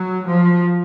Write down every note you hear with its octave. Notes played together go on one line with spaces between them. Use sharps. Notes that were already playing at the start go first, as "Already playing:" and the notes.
Already playing: F#3
F3